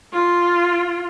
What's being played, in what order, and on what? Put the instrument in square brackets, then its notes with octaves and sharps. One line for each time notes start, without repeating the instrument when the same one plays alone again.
[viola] F4